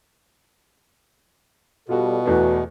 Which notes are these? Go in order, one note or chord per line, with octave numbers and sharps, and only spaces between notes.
B2 G3 F4 F#4 A4
E2 E3 A3 F#4 B4